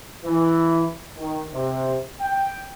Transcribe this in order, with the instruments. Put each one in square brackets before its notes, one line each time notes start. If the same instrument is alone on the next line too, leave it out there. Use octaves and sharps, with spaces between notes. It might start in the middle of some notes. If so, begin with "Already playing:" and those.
[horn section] E3
D#3
C3
G5